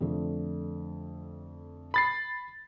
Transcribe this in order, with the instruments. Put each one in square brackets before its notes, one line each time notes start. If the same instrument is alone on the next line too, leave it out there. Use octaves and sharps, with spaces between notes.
[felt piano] F2 D3 A3
[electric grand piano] B5 A6 C7